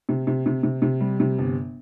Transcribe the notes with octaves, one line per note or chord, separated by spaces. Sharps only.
C3
C3
C3
C3
C3
G3
C3
G1